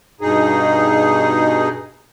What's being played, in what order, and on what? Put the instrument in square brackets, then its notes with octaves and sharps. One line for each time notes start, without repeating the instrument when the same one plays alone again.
[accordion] G2 B2 D#4 G#4